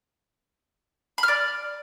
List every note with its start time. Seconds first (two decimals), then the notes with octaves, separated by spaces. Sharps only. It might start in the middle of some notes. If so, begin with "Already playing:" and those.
1.18 B5
1.23 F6
1.28 D5